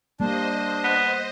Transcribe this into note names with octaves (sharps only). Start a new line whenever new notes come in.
G3 A#3 D4 C5 D#5
B3